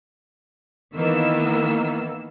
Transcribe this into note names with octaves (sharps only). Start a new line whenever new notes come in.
D#3 E3 A#3 B3 E6